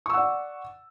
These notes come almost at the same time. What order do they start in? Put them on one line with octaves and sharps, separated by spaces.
C#6 E6 F#5 D5